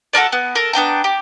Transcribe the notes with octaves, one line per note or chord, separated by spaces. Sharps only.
F#4 A4 A#4 D5
B3
A4 A#4
B3 D4 G5 A#5
G4